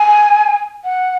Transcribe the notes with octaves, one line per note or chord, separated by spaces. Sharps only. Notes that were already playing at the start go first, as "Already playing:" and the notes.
Already playing: G#5
F#5